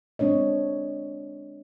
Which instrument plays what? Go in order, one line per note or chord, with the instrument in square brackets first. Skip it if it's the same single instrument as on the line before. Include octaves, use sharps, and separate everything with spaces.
[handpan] G#3 C4 D4 C#5 D#5